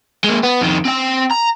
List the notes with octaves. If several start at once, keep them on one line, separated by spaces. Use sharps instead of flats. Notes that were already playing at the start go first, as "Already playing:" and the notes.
G#3 A#3
B3
F2 D#3
C4 G5
A#5